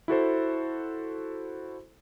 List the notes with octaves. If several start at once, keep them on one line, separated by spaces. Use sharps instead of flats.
E4 F#4 A4 C5